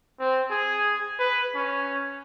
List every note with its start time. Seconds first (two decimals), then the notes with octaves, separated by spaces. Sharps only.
0.19 C4
0.50 G#4
1.19 B4
1.55 C#4